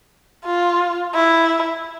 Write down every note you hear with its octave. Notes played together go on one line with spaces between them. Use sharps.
F4
E4